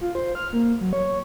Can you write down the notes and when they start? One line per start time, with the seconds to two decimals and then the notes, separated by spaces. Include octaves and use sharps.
0.01 F4
0.15 C5
0.35 F6
0.53 A#3
0.81 F#3
0.93 C#5